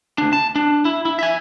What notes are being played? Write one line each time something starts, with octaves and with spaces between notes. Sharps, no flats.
D2 D4
A5
D4
E4
E4
E5 G#5